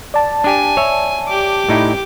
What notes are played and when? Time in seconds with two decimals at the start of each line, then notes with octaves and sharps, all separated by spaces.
0.14 D5 A5
0.44 D4 G4 G#5
0.77 C#5 E5
1.27 G4 D6
1.69 A2 D#4 E4